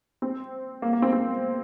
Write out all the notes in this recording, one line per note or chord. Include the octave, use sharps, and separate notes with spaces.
C4
A#3
A#3
C4
C4